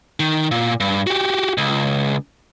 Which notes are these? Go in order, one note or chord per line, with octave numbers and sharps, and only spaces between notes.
D#3
A#2
G2
F#4 G4
C#2